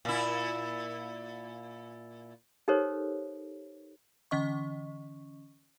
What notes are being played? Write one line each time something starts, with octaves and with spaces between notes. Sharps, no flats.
A#2 E4
D#4 G4 A4 A#4 C5 C#5
D3 E3 C#4 D#5 C#6